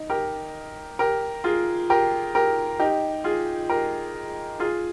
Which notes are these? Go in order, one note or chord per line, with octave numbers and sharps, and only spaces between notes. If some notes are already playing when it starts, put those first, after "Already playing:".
Already playing: D#4
G4 A#4
G4 A#4
F4 G#4
G4 A#4
G4 A#4
D#4 G4
F4 G#4
G4 A#4
F4 G#4